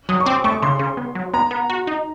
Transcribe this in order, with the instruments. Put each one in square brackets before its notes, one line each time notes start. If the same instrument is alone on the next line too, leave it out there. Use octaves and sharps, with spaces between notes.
[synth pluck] F#3 [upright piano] D#6
[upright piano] C#6
[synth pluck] C4 [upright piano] D6
[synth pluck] A3 [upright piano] C#6
[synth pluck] C#3 [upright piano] C6
[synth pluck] C#3
B3
F#3
[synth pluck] B3 [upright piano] A#5
[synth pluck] B3
F#4
D#4